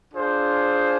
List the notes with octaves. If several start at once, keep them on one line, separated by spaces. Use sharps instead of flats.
D4 F4 G#4 C5